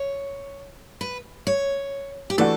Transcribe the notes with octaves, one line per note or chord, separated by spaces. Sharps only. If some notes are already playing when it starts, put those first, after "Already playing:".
Already playing: C#5
B4
C#5
G4
E3 A3 D4 F#4 A4